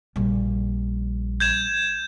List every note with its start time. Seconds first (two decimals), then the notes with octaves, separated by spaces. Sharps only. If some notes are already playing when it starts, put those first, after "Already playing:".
0.16 A#1 A#2 G3
1.40 G6 G#6 E7